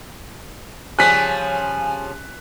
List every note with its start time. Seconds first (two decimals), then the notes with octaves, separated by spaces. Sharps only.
0.99 C#3 F3 G3 G#5 F#6 B6